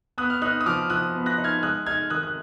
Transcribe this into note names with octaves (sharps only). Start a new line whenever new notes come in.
B3 D#6 F#6
F6
D#4 D#6 F#6
D#6
F3 D6 F6
F3 D#6 F#6
B3
F#6 A#6
D#4
F6 G#6
G#3 D#6 F#6
D#4 F6 G#6
D#3 D#6 F#6
F#6